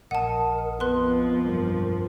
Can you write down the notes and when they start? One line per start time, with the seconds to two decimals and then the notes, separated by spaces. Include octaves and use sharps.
0.11 A#1 A#4 D#5 F#5 A5 D#6
0.80 F2 F3 B3 B4 C6 F#6
1.46 B1 G2 A#4